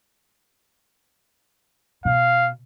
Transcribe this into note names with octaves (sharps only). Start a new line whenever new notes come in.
B2 F5